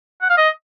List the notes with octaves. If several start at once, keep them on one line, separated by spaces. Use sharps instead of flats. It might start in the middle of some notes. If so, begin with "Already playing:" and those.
F#5
F5
D#5